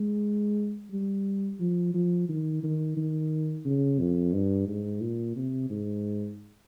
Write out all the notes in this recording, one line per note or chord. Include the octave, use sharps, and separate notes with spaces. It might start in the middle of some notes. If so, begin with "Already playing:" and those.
Already playing: G#3
G3
F3
F3
D#3
D#3
D#3
C#3
F2
G2
G#2
A#2
C3
G#2